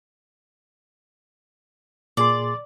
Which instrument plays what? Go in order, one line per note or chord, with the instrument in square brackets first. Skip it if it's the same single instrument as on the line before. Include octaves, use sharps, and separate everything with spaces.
[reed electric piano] A#2 G#4 C6 [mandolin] D5